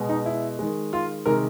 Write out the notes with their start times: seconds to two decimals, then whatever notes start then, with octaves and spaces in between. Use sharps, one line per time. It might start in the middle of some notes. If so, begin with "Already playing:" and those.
Already playing: B2 G#3
0.09 D#4
0.26 E4
0.59 D#3 G#3
0.93 F4
1.26 C3 D#3 G#3 A#4